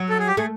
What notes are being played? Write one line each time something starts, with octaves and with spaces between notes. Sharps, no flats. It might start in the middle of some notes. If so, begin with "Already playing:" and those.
Already playing: F#3
A4
G#4
G4
A3 G#4